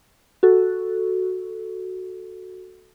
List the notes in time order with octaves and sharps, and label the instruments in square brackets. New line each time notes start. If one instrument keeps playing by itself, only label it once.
[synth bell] F#4 A4